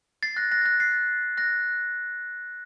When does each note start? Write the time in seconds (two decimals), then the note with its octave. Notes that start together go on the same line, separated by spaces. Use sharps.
0.23 A6 C7
0.37 F#6 A#6
0.52 F#6 A#6
0.62 A6
0.65 F#6 A#6
0.80 A6 C7
1.38 F#6 A#6